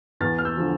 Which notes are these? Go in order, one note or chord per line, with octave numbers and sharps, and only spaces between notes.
E2 F6 A6
F6
E6 G6
D3 F3